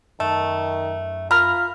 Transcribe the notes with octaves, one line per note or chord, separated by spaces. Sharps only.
F#2 D#3 A3
F4 A#4 B5 F6